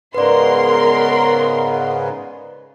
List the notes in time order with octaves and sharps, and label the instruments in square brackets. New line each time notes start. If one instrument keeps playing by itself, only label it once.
[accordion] G#2 C#3 B3 [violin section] A#4 C6 [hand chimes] B4 D5